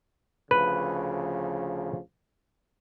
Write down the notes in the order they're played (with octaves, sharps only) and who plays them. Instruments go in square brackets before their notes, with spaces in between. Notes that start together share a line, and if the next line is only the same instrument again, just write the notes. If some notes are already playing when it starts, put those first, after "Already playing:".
[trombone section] D2 C#3 F3 [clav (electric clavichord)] B4